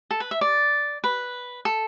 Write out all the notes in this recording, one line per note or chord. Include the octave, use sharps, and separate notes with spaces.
A4
B4
E5
D5
B4
A4